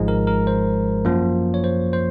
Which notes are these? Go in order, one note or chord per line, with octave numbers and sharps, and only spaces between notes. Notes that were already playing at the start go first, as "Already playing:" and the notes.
Already playing: G#1 G#2 F3 G#3
A#4
A#4
C5
F#2 F3 A#3
C#5
C5
C5